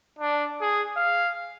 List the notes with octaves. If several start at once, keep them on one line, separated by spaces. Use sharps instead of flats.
D4
G#4
F5